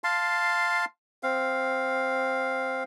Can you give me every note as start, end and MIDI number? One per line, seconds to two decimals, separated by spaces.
0.04 0.85 77
0.04 0.85 81
0.04 0.85 84
1.23 2.84 60
1.23 2.84 77